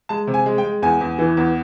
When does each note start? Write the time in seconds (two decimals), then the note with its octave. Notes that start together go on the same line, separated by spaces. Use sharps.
0.09 G#3 A5
0.27 C3
0.34 G#5
0.46 G#3
0.58 G5
0.64 G#3
0.82 E2 G#5
1.01 E2
1.19 E3
1.37 E2